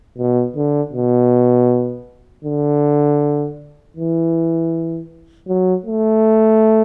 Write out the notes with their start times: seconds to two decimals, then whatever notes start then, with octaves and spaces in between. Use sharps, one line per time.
0.18 B2
0.56 D3
0.93 B2
2.44 D3
3.97 E3
5.48 F#3
5.86 A3